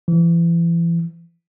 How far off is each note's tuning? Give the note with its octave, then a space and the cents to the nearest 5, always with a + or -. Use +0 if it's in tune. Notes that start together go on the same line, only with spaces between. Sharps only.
E3 +35